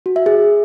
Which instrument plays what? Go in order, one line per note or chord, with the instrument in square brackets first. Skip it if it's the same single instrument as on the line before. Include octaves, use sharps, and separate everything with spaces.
[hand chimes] F#4
E5
G#4